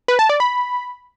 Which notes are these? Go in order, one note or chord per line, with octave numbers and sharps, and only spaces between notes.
B4
A5
D5
B5